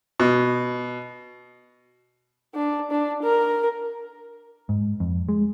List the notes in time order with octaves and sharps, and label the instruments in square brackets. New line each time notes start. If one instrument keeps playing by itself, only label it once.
[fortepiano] B2
[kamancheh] D4
D4
A#4
[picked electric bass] G#2
F2
G#3